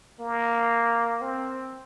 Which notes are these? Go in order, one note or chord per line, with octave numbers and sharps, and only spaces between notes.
A#3
C4